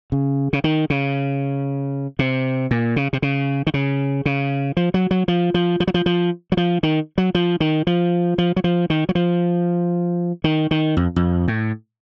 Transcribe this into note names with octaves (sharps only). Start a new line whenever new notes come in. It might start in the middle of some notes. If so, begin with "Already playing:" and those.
C#3
C#3
D#3
C#3
C3
A#2
C#3
C3
C#3
D#3
C#3
C#3
F3
F#3
F#3
F3
F3
F3
F#3
F3
F3
F#3
F3
D#3
F#3
F3
D#3
F3
F3
F#3
F3
D#3
F#3
F3
D#3
D#3
F2
F2
A2